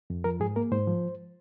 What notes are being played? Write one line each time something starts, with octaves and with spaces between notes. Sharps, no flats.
F2
F3 A#4
G#2 G#4
A#3 A#4
G#2 C5
F3